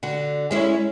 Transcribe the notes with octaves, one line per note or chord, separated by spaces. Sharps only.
D3 F#4
G#3 C#4 E4